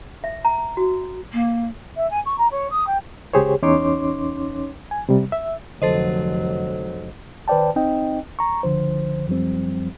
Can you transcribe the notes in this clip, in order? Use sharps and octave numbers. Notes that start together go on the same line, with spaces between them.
E5
A#5
F#4
A#3
E5
G#5
C#6
A#5
C#5
D#6
G5
C#2 G4 G#4 C5 C#5
E2 C#4 D#4 C#5 C6 D6
G#5
C3 G3
E5
F1 D3 F3 F#3 A4 C5 D#5
D#3 B4 C5 D5 G5 A5
C4 D#4 D#5 G5
A#5 C#6
C#2 D3 F3 C5
F#2 F3 G3 C4